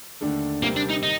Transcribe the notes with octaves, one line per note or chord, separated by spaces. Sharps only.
D#2 D3 A3 D4 A4
C3 G3 A#3 C4 G4 A#4
D4
D#4
D#3 D#4